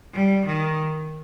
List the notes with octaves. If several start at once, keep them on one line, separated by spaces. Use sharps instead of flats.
G3
D#3